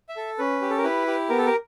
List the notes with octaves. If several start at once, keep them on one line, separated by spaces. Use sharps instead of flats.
E5
A4
C#4 B4
G4
A4
A#4
E4 B4
G4
B3 A#4
A4
A#4